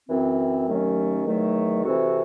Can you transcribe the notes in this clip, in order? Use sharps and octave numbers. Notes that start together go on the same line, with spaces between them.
F#2 E3 C4
D#2 D#3 F#3 A3 C#4
E2 D#3 F#3 A3
C3 E3 C4 F#4 A4